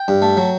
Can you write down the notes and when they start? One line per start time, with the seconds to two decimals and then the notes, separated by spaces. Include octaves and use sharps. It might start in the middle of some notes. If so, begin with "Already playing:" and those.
Already playing: G5
0.08 G2
0.22 A3
0.37 F#3